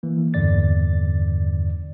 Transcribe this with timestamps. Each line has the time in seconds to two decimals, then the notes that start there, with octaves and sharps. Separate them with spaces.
0.03 E3 A#3
0.34 E2 G2 D3 D5 A6